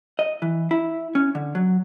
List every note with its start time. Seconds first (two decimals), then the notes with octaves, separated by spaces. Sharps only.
0.19 D#5
0.42 E3
0.71 E4
1.15 C#4
1.35 D3
1.55 F#3